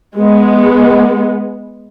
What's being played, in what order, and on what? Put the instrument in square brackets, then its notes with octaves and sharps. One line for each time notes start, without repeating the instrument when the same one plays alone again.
[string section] G#3 B3